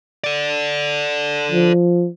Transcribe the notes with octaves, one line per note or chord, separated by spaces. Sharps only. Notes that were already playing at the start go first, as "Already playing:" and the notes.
A4 D5
F3